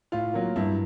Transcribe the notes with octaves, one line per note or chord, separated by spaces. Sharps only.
A2 F4
F#3 A#3
G2 E4